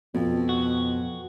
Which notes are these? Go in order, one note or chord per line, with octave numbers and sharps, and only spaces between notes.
F2 B2
F#4